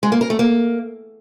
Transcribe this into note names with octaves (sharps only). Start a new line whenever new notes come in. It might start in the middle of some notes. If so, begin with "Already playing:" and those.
G#3
A#3
A#4
A3
A#3